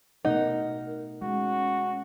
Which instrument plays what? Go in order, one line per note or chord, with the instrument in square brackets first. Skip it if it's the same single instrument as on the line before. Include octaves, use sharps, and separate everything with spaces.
[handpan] B2 A3 F#5 [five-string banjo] D#4 [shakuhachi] A#4
[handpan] G#3 [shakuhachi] C#4 [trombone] F#4